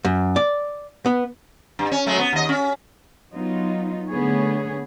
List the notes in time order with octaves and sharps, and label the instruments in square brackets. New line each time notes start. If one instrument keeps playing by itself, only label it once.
[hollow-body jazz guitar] F#2
D5
B3
[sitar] G2
C#4
F#3 G#3 A3
B3
D#2 D#5
C#4
[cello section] F#3 B3 D#4 F4
D3 A3 B3 G#4 C#5